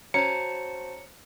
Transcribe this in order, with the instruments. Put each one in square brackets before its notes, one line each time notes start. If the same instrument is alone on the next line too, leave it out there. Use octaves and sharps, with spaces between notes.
[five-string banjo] C#4 [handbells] F#4 C5 A5 [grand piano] A#5 [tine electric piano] C#7